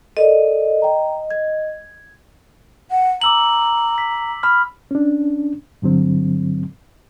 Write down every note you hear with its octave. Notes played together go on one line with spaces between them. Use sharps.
A4 A#4 D5 D#5
G5 A#5
G#6
F#5
A#5 D6 E6 F#7
B6
B5 F6
C#4 D4
G2 D3 F#3 C4